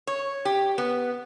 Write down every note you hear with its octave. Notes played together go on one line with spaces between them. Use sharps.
C#5
G4
B3